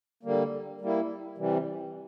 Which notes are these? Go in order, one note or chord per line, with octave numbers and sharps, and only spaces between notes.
D3 G3 A#3
G3 A#3 E4
C3 E3 G3